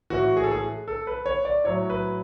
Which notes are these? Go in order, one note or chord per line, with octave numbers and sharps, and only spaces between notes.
A2 E3 F#4
G#4
A4
G#4
A4
B4
C#5
D5
A2 F#3 C#5
B4